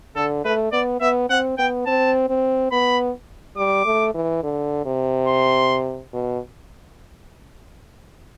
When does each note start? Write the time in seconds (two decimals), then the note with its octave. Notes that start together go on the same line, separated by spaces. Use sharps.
0.16 D3 A4
0.45 A3 B4
0.72 B3 D5
1.01 B3 E5
1.30 C4 F#5
1.58 B3 G5
1.86 C4 A5
2.29 C4
2.72 B3 B5
3.57 G3 D6
3.86 A3
4.14 E3
4.43 D3
4.86 C3
5.27 C6
6.13 B2